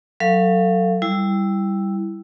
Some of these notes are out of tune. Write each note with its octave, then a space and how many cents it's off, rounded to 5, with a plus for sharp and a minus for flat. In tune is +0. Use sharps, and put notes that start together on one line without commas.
F#3 +0 A4 +30 F5 -25
G3 +0 E4 +0